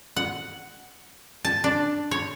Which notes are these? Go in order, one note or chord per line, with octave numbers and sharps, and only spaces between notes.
F#5
A5
D4
C#5